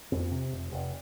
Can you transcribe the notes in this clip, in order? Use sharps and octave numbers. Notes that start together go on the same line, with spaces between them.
F2 C4
C3
F1
F1